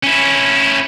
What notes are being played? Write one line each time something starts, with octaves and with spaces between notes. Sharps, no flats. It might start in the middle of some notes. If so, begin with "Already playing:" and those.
C#4 E4